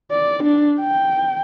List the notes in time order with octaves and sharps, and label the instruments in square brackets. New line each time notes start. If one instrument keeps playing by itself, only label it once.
[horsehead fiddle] D5
D4
G5